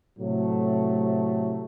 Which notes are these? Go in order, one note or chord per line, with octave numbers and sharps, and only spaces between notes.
A2 C3 F#3 A3